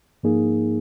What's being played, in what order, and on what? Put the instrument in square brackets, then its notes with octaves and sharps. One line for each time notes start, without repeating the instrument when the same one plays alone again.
[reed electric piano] G#2 F3 A#3 D#4 G#4